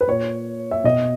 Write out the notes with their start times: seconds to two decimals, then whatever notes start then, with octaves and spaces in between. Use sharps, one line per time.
0.01 B4
0.08 A#2 C#5
0.71 E5
0.84 B2 D#5